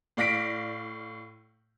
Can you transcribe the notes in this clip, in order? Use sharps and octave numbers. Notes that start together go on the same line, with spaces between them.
A2 D5 F5 A#6 B6 D7